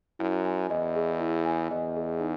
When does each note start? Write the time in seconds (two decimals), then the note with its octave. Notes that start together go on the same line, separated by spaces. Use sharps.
0.19 F#2 E4
0.45 G#5
0.70 E2 D#5
0.96 G#4
1.20 E4
1.46 G#5
1.71 E2 D#5
1.96 G#4
2.20 D#4